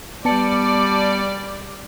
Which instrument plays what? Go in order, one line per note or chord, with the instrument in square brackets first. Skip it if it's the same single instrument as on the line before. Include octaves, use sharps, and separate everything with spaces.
[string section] G3 D5 [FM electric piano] B3 A5 C#7